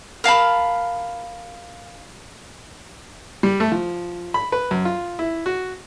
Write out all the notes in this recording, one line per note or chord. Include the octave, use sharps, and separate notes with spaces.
A#4 F5 A5 B5
G3
A3
F3
B5
B4
F#2
F4
E4
F#4